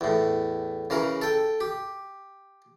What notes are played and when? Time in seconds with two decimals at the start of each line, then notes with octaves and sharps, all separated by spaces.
0.01 E2 A2
0.90 C#3 E3 A#4
1.22 A4 G5
1.61 G4